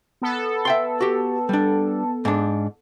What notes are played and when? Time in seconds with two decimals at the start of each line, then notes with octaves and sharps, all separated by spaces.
0.22 B3 A4
0.65 E5 G5 C6
1.00 F#4 G4
1.49 G3 D4
2.25 G#2 D4